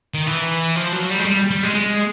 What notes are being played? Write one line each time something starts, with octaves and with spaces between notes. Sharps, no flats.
D#3
E3
F3
F#3
G3
G#3
G3
G3
G#3
G#3